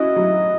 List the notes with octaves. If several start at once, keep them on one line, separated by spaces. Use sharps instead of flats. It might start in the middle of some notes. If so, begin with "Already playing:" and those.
Already playing: C#4 E4 F#4 D#5
F#3